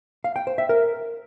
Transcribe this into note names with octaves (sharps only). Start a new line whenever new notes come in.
F5
G5
C5
E5
A#4